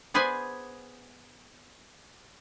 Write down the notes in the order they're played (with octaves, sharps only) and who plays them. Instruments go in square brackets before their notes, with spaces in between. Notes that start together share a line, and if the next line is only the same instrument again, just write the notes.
[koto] B3 G#4 B4 C5 D5 G#5